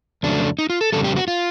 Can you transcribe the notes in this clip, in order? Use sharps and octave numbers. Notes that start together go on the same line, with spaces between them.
F2 C#3 F#3 A3 D4
D#4
F4
A4
F2 C#3 E3 G3 A4
G4
F#4
F4